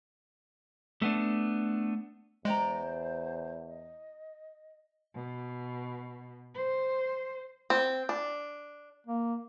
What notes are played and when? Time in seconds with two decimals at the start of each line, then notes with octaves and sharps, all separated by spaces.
1.02 A3 B3 D4
2.45 E2 G#3 C5 D5 G5 A#5
3.67 D#5
5.15 B2
6.54 C5
7.70 C4
8.09 D4
9.07 A#3